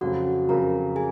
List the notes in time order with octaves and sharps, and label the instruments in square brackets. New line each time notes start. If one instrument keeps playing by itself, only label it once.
[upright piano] F2 C#3 F#3 [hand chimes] F#4 F#5
[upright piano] F2 C#3 F#3 [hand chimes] A#4 A#5
[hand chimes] G#4 G#5